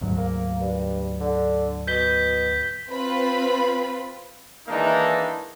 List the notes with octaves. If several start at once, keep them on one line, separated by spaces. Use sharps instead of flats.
D2 G#2 F#3
A#3
G2
D3
B2 G6 B6 G7
C4 F4 B4 B5
D#3 E3 G#3 A#3 D4 D#4